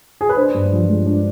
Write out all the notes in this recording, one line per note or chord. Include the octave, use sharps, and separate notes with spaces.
G#4
B4
D4 C5
G2
F3
G#3
D4